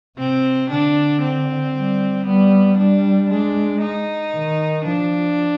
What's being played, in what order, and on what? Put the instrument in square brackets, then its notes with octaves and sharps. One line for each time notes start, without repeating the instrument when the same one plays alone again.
[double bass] C3 [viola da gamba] C4
[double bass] D3 [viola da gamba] D4
[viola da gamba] C4
[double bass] G3
[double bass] G3 [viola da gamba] B3
[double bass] G3 [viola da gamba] D4
[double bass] G#3 [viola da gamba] D4
[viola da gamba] D#4
[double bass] D#3
[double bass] F3 [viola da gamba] D4